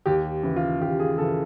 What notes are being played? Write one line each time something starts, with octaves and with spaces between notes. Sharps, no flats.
D#2 G4
C#3 E3
F4
D#2 G4
G#4
C#3 E3 A4